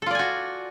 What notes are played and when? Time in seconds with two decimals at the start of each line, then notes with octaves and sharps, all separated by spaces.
0.02 A4
0.06 F4
0.11 D5
0.15 G#5
0.19 F#4